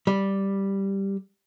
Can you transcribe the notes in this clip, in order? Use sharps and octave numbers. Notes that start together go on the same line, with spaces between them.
G3